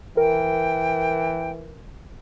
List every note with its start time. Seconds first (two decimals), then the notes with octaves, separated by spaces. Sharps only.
0.17 E3 A#4 G5